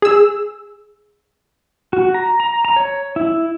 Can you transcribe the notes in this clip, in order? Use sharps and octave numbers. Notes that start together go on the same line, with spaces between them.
G#4 E6
F#4
A#5
A#5
A#5
C#5
E4